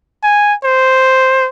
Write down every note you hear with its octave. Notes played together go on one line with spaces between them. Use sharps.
G#5
C5